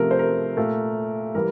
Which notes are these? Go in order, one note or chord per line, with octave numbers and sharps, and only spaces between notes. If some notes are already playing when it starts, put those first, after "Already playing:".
Already playing: C3 F3 A3 A#4
C5
A#4
A#2 A3
E3 G3 A#4